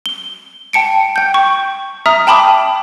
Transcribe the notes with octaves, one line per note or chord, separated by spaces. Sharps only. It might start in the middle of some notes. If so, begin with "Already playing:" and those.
G7
G5 A5 C#7 D7
G5 G6
C#6
E5 A#5 D#6 F6
G5 A5 B5 D6 D#6